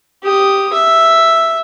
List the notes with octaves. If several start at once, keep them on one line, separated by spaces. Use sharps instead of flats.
G4 D#6
E5